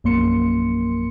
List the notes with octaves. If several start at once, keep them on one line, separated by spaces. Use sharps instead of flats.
A#1 F#2 A#3 C6 C#7